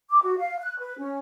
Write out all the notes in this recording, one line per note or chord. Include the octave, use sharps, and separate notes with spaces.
D6
F#4
F5
F#6
B4
C#4